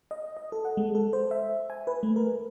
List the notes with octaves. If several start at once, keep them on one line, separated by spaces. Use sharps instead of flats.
D#5
D#5
A4
F#5
G#3
A4
C5
E5
G#5
B4
A3
A#4